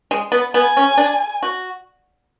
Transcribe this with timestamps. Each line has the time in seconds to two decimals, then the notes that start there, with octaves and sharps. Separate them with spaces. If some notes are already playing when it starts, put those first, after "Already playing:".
0.11 G#3
0.32 B3
0.54 B3 G#5
0.77 C#4
0.98 D4
1.43 F#4